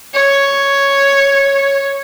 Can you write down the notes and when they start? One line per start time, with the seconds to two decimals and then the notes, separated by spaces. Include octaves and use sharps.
0.14 C#5